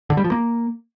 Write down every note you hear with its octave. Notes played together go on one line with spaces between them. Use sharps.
D3
G3
F3
A#3